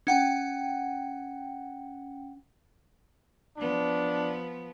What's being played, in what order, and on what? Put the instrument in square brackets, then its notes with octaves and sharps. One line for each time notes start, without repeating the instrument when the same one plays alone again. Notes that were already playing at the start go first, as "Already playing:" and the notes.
[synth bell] C#4 F#5 G5
[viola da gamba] F3 B3 [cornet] D4